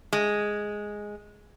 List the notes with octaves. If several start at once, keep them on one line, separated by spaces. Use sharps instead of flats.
G#3